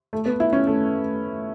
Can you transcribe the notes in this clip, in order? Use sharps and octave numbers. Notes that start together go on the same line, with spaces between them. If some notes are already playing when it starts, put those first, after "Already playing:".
A3
B3
E4
C#4
A3